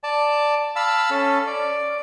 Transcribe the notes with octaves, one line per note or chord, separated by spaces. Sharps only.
D5 A5
F5 A5 B5 E6
C#4 A4
D5